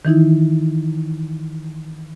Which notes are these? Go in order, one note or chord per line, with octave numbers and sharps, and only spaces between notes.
D#3 E3 D#4 E4